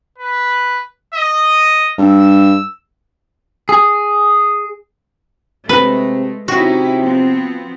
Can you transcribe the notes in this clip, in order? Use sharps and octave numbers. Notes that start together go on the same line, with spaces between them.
B4
D#5
G2 E6
G#4
C3 G#3 A3 B4
C3 C#4 D#4 E4 F#4 G4
F3 B3 C4